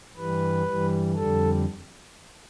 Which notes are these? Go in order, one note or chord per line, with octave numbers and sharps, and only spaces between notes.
G2 E3 G3 B4
G2 E3 G3
F2 D3 G3 A4